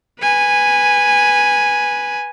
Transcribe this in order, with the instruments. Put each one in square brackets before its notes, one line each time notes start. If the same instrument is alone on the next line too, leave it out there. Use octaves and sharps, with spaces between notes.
[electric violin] B4 G#5